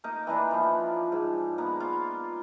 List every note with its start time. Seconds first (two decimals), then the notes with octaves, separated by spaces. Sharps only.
0.04 A#3 D#4 A#4
0.27 E3 A#3 D4
0.51 F3 A#3
1.12 G#2
1.58 A#3 B3
1.80 F4